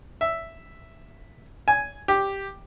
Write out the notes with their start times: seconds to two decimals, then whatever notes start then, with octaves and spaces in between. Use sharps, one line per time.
0.21 E5
1.68 G#5
2.08 G4